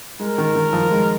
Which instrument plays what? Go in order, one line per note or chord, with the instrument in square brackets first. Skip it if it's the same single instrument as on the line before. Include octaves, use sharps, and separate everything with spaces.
[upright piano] G#3 [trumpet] A#4
[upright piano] D#3
D#3
F3
G#3